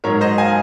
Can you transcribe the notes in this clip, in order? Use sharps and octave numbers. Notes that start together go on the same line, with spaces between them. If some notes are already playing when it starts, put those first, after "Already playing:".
G#2 F#3 A#4 C#5
C5 D#5
F5 G#5